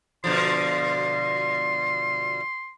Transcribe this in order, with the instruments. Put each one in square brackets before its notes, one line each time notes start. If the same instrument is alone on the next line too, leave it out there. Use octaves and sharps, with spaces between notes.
[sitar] B2 D3 F3 [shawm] C6